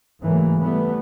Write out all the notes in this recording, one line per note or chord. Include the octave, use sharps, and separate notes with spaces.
G#2 C#3 E3 F#3 A3 A#3
E3 G3 A3 B3